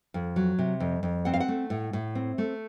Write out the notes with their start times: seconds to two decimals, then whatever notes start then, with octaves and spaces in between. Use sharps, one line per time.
0.14 F2
0.36 F#3
0.59 C3
0.80 F2
1.03 F2
1.25 C4 F#5
1.34 F5
1.40 F#5
1.48 A3
1.70 A2
1.93 A2
2.15 C4
2.38 A3